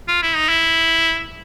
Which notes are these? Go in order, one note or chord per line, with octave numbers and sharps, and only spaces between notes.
F4
E4
D#4
E4